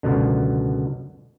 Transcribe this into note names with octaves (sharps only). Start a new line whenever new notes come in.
C#2 F#2 B2 D3